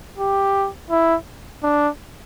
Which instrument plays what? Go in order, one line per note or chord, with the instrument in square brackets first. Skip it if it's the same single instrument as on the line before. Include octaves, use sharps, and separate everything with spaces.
[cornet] G4
E4
D4